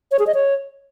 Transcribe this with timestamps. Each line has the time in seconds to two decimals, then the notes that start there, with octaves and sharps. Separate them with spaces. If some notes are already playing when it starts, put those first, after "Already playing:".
0.11 C#5
0.19 G#4
0.27 D#5
0.34 C#5